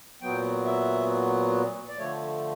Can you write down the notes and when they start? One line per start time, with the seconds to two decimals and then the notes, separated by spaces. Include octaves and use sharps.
0.22 A#2 F#3 B3 G5
0.65 E5
1.89 D5
1.97 D3 F3 A3 C#5